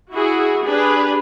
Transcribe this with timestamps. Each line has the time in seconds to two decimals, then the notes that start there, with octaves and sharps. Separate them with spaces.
0.12 E4 F#4 G#4
0.66 D4 G4 G#4 B4